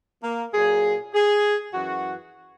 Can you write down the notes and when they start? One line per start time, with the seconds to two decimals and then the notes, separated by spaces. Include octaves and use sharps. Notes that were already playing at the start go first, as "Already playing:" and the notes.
0.23 A#3
0.53 A#2 F#3 G#4
1.13 G#4
1.73 F#2 E3 F#4